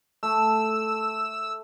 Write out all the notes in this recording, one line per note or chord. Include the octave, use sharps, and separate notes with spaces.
A3 E6